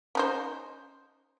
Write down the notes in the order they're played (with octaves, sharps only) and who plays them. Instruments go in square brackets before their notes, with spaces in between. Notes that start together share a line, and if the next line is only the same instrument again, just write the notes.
[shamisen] C#4 D#4 C5